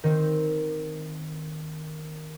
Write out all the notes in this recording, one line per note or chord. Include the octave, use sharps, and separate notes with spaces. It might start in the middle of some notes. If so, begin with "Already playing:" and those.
D#3 C4